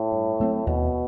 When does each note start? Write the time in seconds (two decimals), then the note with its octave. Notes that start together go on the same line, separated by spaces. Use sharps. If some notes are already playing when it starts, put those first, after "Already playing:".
Already playing: A2
0.12 G2
0.40 F#3 A3 C4
0.66 D#2 B2